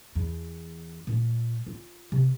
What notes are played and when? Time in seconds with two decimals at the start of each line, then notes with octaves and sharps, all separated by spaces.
0.15 E2
1.07 A#2 A3
1.67 F4
2.12 C3